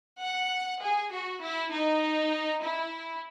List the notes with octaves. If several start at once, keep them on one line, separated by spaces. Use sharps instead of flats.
F#5
G#4
F#4
E4
D#4
E4